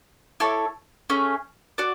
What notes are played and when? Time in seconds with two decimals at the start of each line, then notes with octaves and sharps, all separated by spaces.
0.40 E4 A4 C#5
1.10 A3 C#4 G#4
1.78 F#4 D5